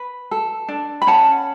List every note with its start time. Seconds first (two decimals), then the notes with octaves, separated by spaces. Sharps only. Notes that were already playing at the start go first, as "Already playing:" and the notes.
Already playing: B4
0.31 A4
0.68 D4
1.02 B5
1.07 C#4 F#5 A5